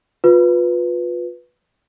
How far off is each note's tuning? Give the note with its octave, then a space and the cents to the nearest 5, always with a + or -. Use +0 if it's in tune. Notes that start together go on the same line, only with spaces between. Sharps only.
F4 +30 B4 +0